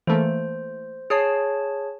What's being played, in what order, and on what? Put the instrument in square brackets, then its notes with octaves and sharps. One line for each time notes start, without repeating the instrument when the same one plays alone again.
[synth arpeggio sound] E3 A3 A#3 [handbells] C5
[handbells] G#4 C#5 A5 [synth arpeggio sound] D#6 C7